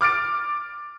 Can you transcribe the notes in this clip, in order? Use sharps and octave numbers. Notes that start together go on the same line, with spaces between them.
D6 F6 A6 D7